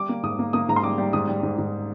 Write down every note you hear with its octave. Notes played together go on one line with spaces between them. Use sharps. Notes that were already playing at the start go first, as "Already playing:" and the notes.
Already playing: G3 D6
A#3
G#2 D#6
A#3
A#3 D#6
G#2 A#5
C6
G3 D6
G3
G#2 D#6
G3
G#2
G#2